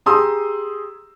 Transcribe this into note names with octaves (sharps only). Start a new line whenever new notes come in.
G4 G#4 A#5 C6 D#6 E6